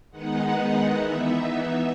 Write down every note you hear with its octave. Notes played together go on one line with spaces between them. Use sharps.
D#3 G#3 B3 D#4 F#5
E3 B3 D#4 E5